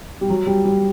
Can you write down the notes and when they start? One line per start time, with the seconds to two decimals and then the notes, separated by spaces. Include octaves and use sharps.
0.21 G3
0.30 F#3
0.47 G3
0.65 G3